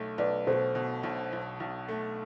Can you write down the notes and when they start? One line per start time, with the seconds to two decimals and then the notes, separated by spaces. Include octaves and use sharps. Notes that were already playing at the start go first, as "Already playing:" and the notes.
Already playing: B1 A3
0.18 B1 B4 D5
0.47 B2 A4 C5
0.75 B2
1.03 B1
1.33 B1
1.60 B1
1.88 A3